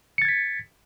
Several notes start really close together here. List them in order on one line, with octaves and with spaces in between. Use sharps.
C#7 A6 G#6 B6